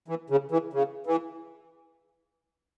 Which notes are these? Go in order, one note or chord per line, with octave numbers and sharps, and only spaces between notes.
E3
C#3
E3
C#3
E3